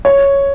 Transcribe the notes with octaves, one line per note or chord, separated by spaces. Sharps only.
C#5